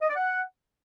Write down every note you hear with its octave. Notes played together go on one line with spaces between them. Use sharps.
D#5
D5
F#5